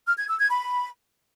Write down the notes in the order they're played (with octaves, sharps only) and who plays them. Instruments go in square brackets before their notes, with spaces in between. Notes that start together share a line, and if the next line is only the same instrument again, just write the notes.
[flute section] F6
G#6
E6
G#6
B5